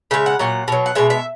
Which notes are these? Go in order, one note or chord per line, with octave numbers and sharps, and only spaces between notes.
C#3 G#3 E5
F#5
A#2 F#3 F#5
B2 F#3
F#5
B2 G#3 E5
E5